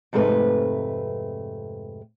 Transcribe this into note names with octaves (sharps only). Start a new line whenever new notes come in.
F2 G#2 C3 A3 B4